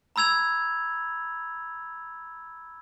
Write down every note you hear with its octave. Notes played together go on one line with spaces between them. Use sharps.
A#5 B5 E6 G#6 F7